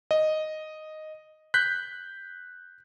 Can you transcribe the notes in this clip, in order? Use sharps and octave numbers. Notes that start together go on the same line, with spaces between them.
D#5
F#6 G6 B6